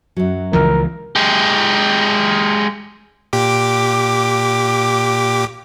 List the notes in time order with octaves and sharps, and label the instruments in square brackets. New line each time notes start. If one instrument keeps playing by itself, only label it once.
[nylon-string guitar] F#2 F#3
[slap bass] C#2 E3 F3 [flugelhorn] A#4
[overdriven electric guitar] G#3 G4
[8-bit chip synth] A#2 G4 D6